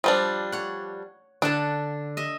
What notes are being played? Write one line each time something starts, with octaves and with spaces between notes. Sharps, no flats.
F3 G3 D4
C#5 F#5
D3 D4 F#5 A5
D#5 E5